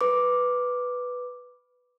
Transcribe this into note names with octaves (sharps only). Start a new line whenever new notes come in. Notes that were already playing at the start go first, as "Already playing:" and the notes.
B4 D6